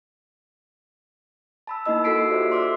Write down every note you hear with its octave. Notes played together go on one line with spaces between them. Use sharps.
A5 B5 E6
A#3 D#4 E4 D#5 E6
F#4 A4 E6 B6 C7 D7
F4 G4 C5 D5 E5
C6 D6 E6 F6